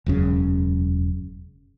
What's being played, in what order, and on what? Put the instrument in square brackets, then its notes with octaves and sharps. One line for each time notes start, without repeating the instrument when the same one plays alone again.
[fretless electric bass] E1 F#2 C#3